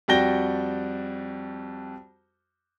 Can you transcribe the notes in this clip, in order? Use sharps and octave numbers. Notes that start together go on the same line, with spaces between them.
F2 G3 F#4 G5 A#6 G7